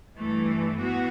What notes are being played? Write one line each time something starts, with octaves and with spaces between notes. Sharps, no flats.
G2 E3 A3
E3 B3 F#4